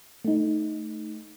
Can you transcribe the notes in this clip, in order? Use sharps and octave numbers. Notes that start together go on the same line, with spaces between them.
A3 D#4